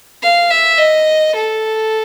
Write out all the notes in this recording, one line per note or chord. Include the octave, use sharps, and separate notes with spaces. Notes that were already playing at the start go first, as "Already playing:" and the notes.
F5
E5
D#5
A4